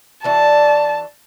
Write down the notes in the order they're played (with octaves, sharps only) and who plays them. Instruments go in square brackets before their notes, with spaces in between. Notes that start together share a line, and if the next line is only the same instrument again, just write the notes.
[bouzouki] E3 D4 F#4 [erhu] A5